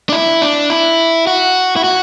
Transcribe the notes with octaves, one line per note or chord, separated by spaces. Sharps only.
D4
E4
D4
E4
F#4
E4
F#4